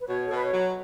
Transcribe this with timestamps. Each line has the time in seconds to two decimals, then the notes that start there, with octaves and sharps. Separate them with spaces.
0.01 B4
0.07 B2 C#5
0.25 A4
0.30 B2 B4
0.42 C#5
0.52 F#3